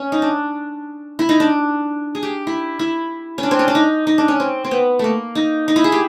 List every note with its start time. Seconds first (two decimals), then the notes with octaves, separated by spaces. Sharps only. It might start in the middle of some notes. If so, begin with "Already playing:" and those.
Already playing: C#4
0.12 D#4
0.22 D4
1.19 E4
1.29 D#4
1.40 D4
2.15 G#4
2.23 G4
2.47 E4
2.79 E4
3.38 C#4
3.43 D4
3.51 C4
3.59 C#4
3.68 D4
3.75 D#4
4.07 D#4
4.18 D4
4.28 C#4
4.40 C4
4.64 C4
4.71 B3
4.99 A3 A#3
5.35 D#4
5.68 D#4
5.76 E4
5.84 G#4
5.92 G4